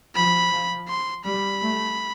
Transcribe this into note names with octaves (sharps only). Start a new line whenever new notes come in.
F3 B5
F3
C6
G3 B5
A3